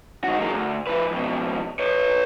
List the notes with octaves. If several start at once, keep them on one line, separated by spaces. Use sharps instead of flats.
D#3 F#4
F#3 A#3
D2
F3 B4
F2 B2
B4 C#5